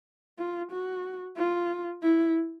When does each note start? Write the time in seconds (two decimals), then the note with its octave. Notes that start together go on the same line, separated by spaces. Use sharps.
0.38 F4
0.72 F#4
1.37 F4
2.02 E4